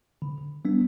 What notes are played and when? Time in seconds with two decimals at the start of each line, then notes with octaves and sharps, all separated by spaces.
0.22 D3
0.65 G3 B3 D4